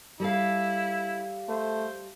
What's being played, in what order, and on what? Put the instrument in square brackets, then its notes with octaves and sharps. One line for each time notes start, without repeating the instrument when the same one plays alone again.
[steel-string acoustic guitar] G3 A4 F5 [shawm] E4
[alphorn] A3 [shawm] C5